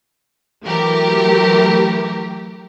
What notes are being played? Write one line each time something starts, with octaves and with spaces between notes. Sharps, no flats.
E3 F#3 A3 G4 A#4